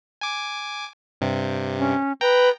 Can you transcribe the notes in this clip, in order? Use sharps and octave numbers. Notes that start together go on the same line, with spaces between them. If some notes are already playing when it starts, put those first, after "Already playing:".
G#5 D6
G2 C3
C#4
B4 G5 A#5